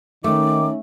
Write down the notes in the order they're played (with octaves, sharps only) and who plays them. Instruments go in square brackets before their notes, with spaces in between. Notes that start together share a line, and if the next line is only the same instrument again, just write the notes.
[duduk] D#3 [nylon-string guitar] A3 [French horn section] C#4 D#4 [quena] D6